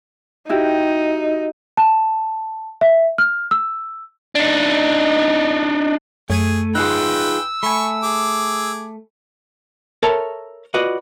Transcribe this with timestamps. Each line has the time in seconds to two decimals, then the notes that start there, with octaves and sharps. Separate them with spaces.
0.49 D#4 E4 F#4 G4
1.77 A5
2.81 E5
3.18 F6
3.51 E6
4.35 D4 D#4
6.30 F#2 A3 G#4 G#6 D#7
6.75 D#4 F4 G#4 B4 G5 E6 F#6
7.63 A3 G#5 B5 C#6
8.03 G#4 D6
10.03 A4 A#4 C#5 E5 A5 B5
10.74 F4 F#4 B4 D5 D#5